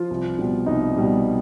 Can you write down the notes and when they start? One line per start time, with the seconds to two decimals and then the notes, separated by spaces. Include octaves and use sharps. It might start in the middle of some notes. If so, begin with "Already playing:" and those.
Already playing: F3 F4
0.11 C2
0.38 B2 G3
0.66 C2 D#4
0.96 B2 G3